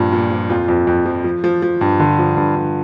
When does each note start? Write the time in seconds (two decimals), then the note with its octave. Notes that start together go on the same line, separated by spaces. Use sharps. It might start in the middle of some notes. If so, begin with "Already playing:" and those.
Already playing: G2 A#2 F3
0.12 A#2
0.31 F3
0.50 F2 F4
0.68 F2
0.87 F2
1.06 F3
1.24 F3
1.44 F3
1.62 F3
1.81 G2
2.00 D3
2.19 F3
2.37 G2
2.56 G2